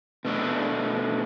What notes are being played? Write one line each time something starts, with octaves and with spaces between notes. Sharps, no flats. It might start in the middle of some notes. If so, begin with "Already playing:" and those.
B2 A3 D4